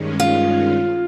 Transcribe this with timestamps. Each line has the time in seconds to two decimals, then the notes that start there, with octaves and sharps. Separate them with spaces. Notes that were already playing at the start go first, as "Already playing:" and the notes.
Already playing: G2 D#3 G#3 C#4
0.20 F4